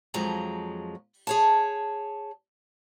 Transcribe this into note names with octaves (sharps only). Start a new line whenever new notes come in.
F2 F3 F#3 G#3 A#5
G#4 C#5 A5